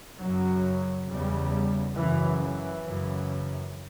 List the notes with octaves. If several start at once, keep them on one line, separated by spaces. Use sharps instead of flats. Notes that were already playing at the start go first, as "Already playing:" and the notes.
F#2 C#3 F#3
E2 C#3 G3
F#2 C#3 E3
E3
F#2 C#3